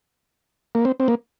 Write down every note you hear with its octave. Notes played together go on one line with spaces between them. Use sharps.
A#3
C4
C4
A#3